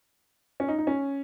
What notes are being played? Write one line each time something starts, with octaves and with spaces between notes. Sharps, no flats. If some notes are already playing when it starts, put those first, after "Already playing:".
C#4
D#4
D#4
C#4